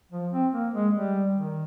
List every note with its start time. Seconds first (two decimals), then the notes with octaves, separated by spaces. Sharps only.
0.11 F3
0.32 C4
0.52 A#3
0.74 G#3
0.94 G3
1.35 D#3